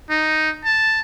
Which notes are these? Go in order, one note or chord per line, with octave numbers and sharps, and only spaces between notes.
D#4
A5